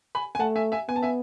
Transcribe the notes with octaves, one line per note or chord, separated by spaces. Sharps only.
G#5 B5
G#5
A3 F#5 A5
E5 G#5
E5 G#5
B3 G#5
A5
E5 G#5